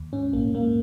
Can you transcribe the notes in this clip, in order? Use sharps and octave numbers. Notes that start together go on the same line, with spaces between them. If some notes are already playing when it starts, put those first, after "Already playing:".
Already playing: D#2
G#2 C#4
A#1 A#3
G#2 A#3